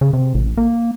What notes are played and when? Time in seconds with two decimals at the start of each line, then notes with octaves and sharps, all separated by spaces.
0.01 C#3
0.13 C3
0.35 A1
0.57 A#3